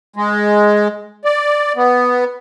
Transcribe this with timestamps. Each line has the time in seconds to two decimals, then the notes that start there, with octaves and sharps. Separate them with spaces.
0.16 G#3
1.25 D5
1.76 B3